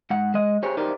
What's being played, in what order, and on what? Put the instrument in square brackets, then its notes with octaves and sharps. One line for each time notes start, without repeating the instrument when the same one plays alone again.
[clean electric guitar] G#2 F#5
G#3 D#5
G4 G#4 C5 C#5
D#4 G4 A#4 C5 D5